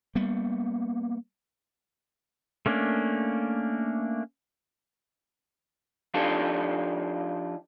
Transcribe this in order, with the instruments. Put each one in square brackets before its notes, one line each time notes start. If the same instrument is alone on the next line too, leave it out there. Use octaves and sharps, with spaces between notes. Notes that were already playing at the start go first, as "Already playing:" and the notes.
[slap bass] G3 A#3 B3
[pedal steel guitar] A3 A#3 C#4 D4
[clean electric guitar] F3 D4 D#4 F4 G4 A4